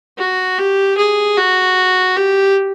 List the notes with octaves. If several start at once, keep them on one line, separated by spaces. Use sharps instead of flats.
F#4
G4
G#4
F#4
G4